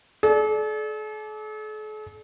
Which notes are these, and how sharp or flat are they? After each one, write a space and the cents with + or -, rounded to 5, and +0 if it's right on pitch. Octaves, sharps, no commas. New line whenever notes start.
A4 -45 D5 +0